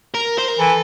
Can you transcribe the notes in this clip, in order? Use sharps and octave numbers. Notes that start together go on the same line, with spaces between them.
A#4
C5
A#4
E3 A4